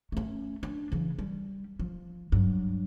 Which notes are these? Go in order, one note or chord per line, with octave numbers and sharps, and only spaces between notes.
A3 C#4
D4
C#3 E3
G3
F3
G2 F#3